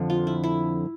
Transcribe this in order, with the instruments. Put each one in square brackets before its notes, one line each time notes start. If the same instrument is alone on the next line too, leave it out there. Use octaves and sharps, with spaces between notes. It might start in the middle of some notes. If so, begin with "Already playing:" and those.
Already playing: [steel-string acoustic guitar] F2 D3 F3
[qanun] F4
E4
E4